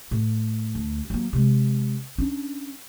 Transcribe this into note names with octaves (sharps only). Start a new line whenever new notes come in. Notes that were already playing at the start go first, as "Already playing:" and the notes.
A2
D2
F#3 A#3
C3 G#3
C#4 D4